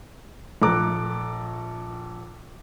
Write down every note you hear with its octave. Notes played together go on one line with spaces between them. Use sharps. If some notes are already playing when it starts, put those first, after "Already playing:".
A#1 A4 A#5 D6 F#6